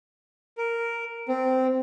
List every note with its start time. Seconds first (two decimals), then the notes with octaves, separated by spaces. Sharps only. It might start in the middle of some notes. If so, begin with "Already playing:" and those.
0.58 A#4
1.28 C4